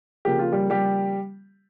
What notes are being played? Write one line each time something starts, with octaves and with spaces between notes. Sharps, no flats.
C#3 F3 A#3 G4
F4
G3 G4
G3 G4